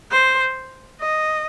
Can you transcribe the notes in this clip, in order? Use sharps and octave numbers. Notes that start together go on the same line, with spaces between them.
C5
D#5